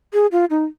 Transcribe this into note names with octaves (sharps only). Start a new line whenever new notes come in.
G#4
F4
D#4